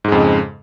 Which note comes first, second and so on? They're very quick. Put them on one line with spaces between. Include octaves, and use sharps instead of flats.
G#2 G#3 F2 C#3